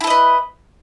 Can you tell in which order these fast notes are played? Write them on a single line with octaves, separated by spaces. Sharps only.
E4 A4 D#5 B4